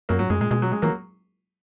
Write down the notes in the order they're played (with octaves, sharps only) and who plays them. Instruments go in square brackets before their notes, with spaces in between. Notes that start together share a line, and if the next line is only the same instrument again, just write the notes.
[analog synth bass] F#2 [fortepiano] F#3 A#3
[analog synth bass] G#2 [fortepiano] F#3
[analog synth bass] F#2 [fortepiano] G#3
[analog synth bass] A#2 [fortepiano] G#3
[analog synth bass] B2 [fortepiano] G#3
[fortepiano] F#3
G#3
[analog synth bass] E3 [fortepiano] F#3 A#3